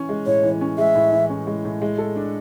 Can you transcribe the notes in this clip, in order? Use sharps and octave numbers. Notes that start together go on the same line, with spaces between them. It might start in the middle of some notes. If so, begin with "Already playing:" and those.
Already playing: E3 C#4
G#3
A2 C#5
E3
C#4
G#3 E5
A2
E3
C#4
G#3
A2
G#3
A4
D4